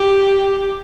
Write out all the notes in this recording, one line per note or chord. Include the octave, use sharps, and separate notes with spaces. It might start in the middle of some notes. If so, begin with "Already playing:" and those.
Already playing: G4